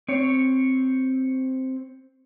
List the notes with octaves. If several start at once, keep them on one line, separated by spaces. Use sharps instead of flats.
C4 C#5